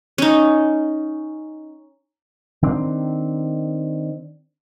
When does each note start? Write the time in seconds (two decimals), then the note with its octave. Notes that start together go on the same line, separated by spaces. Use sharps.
0.18 C#4 D#4
2.62 D#3 C4 D4